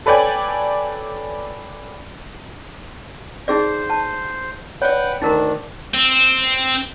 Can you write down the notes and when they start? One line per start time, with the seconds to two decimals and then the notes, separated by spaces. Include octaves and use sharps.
0.06 A4 B4 C#5 D5 G5 G#5
3.48 D#4 G#4 C5 D5
3.90 A5
4.82 B4 C#5 D5 F#5 G5
5.22 D2 D#3 D4 D#4 A#4 A#5
5.94 C4